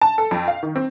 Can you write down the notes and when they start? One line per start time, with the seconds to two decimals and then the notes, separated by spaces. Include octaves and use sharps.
0.01 A5
0.18 A4
0.31 F2
0.48 F5
0.63 D#3
0.76 C4